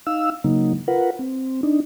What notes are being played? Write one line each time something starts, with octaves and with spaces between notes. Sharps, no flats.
D#4 F5 E6
C#3 F#3 A#3 D#4
F4 A#4 B4 F#5
C4
D4 D#4